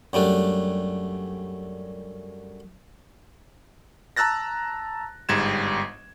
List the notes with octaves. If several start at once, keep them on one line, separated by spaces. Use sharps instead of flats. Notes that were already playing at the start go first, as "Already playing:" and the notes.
F#2 G3 A3 D4
A5 A#5 E6 F#6 A6 A#6
G1 G#2 G3 G#6 E7